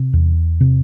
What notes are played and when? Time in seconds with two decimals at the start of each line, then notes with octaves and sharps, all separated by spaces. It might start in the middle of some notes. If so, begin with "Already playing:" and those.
Already playing: C3
0.13 E2
0.61 C3